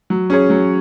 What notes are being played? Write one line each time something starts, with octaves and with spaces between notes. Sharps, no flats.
F#3
C#4 G#4 C#5
F#3